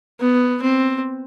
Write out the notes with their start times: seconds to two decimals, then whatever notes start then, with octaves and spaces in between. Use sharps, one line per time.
0.20 B3
0.62 C4